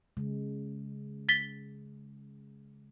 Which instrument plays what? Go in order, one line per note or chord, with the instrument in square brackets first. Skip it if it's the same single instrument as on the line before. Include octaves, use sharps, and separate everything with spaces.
[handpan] C#3 G#3
[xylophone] A6 B6 G7